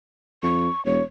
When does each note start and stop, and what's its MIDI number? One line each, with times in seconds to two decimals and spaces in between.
0.43 0.69 41
0.43 0.84 85
0.85 1.00 28
0.85 1.03 73